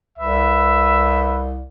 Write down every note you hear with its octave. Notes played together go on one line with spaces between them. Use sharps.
C2 B4 E5